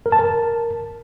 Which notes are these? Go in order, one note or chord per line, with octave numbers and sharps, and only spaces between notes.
A#4
A5
A#4